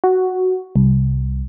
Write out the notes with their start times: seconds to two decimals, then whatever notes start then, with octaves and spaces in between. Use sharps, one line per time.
0.04 F#4
0.76 C2